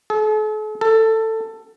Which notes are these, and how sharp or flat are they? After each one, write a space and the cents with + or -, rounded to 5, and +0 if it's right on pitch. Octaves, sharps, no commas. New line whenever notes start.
A4 -45
A4 +15